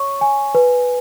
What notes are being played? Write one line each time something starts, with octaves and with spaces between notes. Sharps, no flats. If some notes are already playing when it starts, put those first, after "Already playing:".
Already playing: C#5 C#6
G#5
B4